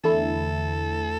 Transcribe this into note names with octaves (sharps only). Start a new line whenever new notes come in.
E2 D3 A3 E4 A4